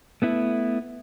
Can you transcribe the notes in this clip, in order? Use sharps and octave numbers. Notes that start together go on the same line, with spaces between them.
A3 B3 E4